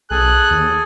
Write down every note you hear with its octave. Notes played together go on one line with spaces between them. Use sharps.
B1 G#4 A4 G#5 F#6
D#2